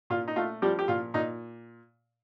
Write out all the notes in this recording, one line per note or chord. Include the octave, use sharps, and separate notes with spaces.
A#2 F4
D#4
A3 F4
F3 G3 G4
G4
A#2 F4
A#2 D#4